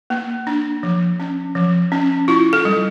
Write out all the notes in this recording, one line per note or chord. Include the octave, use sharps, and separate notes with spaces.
A#3
D4
F3
C#4
F3
C#4
E4 F4
A4
G3